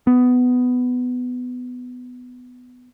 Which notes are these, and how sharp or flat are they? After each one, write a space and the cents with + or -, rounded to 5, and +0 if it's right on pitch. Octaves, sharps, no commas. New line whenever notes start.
B3 +15